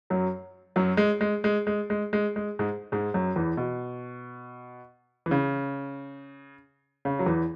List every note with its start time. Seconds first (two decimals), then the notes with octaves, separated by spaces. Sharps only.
0.10 F#2 F#3
0.76 F#2 F#3
0.97 G#3
1.21 G#3
1.44 G#3
1.67 G#3
1.90 G#3
2.13 G#3
2.36 G#3
2.59 G#2 G#3
2.92 G#2 G#3
3.14 F#2 F#3
3.36 E2 E3
3.57 B2
5.26 E3
5.31 C#3
7.05 C#3
7.19 F#3
7.26 E2 E3